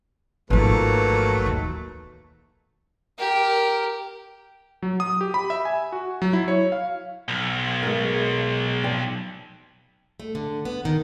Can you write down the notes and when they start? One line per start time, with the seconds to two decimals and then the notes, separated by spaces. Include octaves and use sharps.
0.50 G#1 G#2 F3 F#3 A3 A#3 B4
1.46 D#2
3.18 G4 A#4
4.82 F#3
5.00 D#6
5.21 G4
5.34 B5
5.50 E5
5.65 G#5
5.92 F#4
6.22 F#3
6.33 E4
6.48 C#5
6.72 F5
7.29 B1
7.83 G#3 A#4
8.84 F3 D5 G5
10.20 A3
10.35 D3
10.65 B3
10.85 D#3